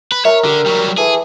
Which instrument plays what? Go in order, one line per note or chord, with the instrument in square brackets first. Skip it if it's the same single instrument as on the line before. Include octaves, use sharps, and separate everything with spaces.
[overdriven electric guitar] B4
[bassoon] A#4 [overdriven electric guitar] C#5 [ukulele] E5 A#5
[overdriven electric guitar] D3 [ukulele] G4
[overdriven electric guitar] F#3 G3
[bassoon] E3 [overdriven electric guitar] G#4 [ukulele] A4